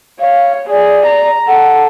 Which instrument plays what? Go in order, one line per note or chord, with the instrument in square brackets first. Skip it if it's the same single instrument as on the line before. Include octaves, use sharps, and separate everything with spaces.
[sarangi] C#5 [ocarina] F5
[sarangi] G#4 [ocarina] D5
[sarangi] A#5
[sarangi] A4 [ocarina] F#5